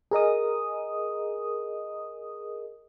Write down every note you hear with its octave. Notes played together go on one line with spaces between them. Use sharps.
G#4 A#4 D#5 D#6